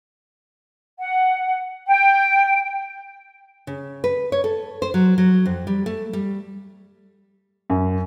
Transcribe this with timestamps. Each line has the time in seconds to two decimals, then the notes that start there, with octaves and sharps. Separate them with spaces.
0.98 F#5
1.88 G5
3.67 C#3
4.04 B4
4.32 C#5
4.44 A4
4.82 C5
4.94 F#3
5.18 F#3
5.46 F2
5.67 G3
5.86 A3
6.13 G3
7.70 F#2